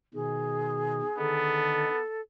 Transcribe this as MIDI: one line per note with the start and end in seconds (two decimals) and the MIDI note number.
0.14 1.02 47
0.14 1.02 51
0.14 1.60 68
1.18 1.87 50
1.18 1.87 51
1.18 2.01 59
1.18 1.87 63
1.18 2.21 69